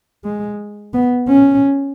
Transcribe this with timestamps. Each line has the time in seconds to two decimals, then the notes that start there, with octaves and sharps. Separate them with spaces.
0.25 G#3
0.93 B3
1.28 C#4